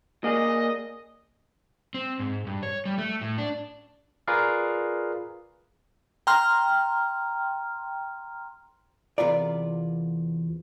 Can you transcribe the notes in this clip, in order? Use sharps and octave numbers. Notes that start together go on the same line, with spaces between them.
A#3 G#4 D5 D#5
C4
G#2
G2
C#5
G3
A3
A2
D4
F4 G#4 A#4 B4 D5 F5
G5 A#5 C6 F6
E2 C3 B3 F4 A#4 D5